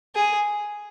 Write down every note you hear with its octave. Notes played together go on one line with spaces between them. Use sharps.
G#4